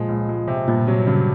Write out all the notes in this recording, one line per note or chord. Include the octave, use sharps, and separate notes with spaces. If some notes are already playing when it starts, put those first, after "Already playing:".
Already playing: A#2 F3 G#3
C#2
G#3
C3
G2 A#2
C3 F#3
G2 C#3